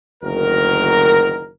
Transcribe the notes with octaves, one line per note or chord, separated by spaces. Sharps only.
F#1 D2 D#3 F#4 A#4